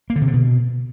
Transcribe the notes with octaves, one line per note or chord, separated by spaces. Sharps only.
A#3
D3
C3
D3
B2